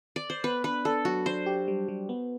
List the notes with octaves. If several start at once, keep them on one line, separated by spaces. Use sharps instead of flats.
D5
C5
B3 B4
D4 B4
D4 A4
F#3 F#4
D4 C5
G4
G3
G3
B3